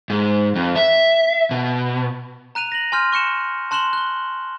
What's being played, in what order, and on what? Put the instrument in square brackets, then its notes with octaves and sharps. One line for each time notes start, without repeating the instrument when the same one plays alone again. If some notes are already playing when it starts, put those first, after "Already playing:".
[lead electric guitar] G#2
F2
E5
B2
[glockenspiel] A#5 F#6 D#7 F7
A#6 F#7
G#5 C6 F6 G6
C#6 F#6 C#7 E7
A5 C6 F#6 E7 F#7 G7
F#6 G7